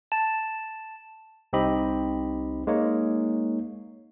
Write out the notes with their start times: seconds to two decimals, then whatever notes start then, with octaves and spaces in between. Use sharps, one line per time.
0.12 A5
1.53 C2 C4 D#4 G4 D#5 B5
2.67 G#3 A#3 D#4 C#5